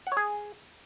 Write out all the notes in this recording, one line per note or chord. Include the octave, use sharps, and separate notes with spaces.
F#5
C#5
G#4